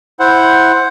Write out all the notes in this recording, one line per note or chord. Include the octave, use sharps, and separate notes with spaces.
E4 C5 F#5